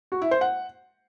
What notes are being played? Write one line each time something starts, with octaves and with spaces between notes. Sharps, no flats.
F#4
E4
C5
F#5